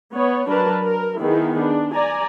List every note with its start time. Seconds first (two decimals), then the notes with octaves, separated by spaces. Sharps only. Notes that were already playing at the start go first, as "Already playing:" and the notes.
0.13 B3 C#5
0.48 F#3 D4 A#4 B4 A5
0.84 A#4
1.19 D#3 B3 E4 G#4
1.60 D4
1.94 D5 G#5 A#5